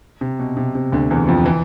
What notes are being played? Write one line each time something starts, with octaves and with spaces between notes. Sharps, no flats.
C3
B2
C3
C3
D2 D3
E2 E3
F2 F3
E3